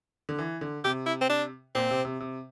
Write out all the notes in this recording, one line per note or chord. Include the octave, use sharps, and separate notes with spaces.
D3
E3
D3
C3 G4
E4
C4
D4
A#2 C4
C3
C3
C3